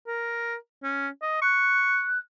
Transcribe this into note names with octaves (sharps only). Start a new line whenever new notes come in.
A#4
C#4
D#5
C#6 F#6